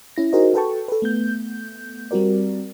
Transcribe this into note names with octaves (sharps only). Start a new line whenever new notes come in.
C#4 E4 A#6
D#4 F#4 G#4 A#4 C5 D#5
F#4 A4 B4 G5 A5 C#6
A4 B4
A3 B3 G6
G3 C4 F#4 A#4 D5